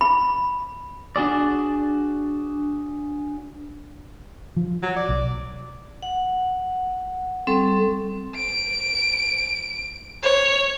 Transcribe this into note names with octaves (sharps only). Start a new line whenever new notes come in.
B5
D4 F#4 G#4 D5
F3
F#3
D5
B1
F#5
G3 C4 A4 C#6
D7
C#5